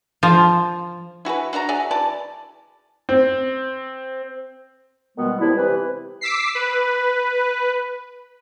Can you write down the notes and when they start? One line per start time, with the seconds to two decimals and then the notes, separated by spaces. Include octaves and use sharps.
0.23 F3
1.25 E4 F#4 G#4 B4
1.53 D4 F#4 D5 A#5
1.69 F#4 G#4 D5 E5
1.91 E3 D5 A5
3.09 C4
5.18 B2 D#3 G3 G#3 B3
5.41 C3 D4 E4
5.57 C3 E3 B4
6.21 D6 E6 B6 C7
6.55 B4